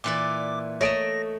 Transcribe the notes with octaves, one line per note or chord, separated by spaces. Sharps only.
A#2 E3 D5 D6
A3 C#5 D#5 A#5 A#6 D7 E7